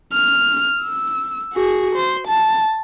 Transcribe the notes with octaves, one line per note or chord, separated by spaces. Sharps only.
F6
E6
F#4 G#4
C5
A5